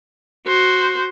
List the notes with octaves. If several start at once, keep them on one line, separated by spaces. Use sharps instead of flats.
F#4 C5